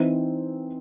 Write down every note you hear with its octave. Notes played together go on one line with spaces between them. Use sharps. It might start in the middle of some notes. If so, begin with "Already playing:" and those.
Already playing: E3 C4 D#4